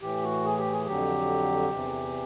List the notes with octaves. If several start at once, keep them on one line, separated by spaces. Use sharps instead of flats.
A2 E3 G4
F#4
G#4
G4
G#4
F2 D3 F#3 G4
E2 C3 E3